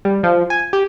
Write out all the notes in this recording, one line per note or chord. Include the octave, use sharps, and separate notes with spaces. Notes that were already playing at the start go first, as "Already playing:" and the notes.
G3
F3
G#5
G4